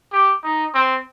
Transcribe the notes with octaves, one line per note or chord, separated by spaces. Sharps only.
G4
D#4
C4